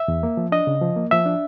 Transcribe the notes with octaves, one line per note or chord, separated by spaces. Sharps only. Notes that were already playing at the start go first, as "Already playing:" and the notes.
Already playing: E5
E2
A#3
F3
D4 D#5
C#3
F3
A#3
F3 E5
D4